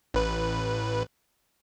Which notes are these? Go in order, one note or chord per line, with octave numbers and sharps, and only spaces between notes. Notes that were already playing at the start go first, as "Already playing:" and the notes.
A1 B4